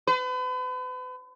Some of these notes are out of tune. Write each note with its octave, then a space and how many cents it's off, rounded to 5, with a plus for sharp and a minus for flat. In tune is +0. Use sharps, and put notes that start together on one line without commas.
B4 +40